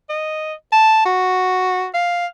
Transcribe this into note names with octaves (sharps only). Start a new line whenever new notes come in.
D#5
A5
F#4
F5